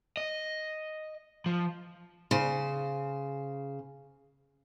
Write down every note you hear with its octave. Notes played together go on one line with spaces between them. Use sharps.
D#5
F3
C#3 C5